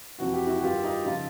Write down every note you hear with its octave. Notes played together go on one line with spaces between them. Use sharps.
F2 C3 E3 F#4
G4
E4 F#4
F#4
G2 D#3 F4 G4
D#4 F4
C#3 F3 D#4 F4